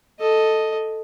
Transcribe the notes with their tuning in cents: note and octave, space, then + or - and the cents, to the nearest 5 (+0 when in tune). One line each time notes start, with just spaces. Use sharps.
A4 +0 D#5 +0